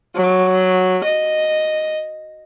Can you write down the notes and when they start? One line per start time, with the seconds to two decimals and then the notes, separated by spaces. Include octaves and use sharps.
0.16 F#3
1.04 D#5